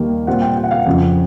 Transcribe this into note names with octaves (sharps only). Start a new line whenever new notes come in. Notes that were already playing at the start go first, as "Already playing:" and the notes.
Already playing: D#2 D#3 G3 A#3
A#2 G3 C4 F4 F#5
G5
G5
F#5
F5
F#5
F2 C#3 F3